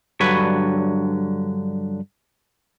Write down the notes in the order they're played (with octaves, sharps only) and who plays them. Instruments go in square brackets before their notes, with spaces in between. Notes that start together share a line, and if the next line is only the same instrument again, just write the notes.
[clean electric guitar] G2 D3 F#3 B4 C#5 B5